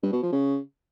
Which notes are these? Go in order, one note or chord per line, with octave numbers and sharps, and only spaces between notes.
G2
B2
F3
C#3